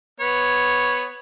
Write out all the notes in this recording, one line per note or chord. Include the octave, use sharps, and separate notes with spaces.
B3 C#5